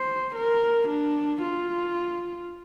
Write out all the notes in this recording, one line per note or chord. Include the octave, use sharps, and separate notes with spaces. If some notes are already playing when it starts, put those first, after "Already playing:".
Already playing: C5
A#4
D4
F4